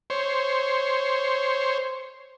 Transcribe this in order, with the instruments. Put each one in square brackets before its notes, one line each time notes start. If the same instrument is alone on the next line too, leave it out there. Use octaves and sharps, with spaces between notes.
[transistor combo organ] C5 C#5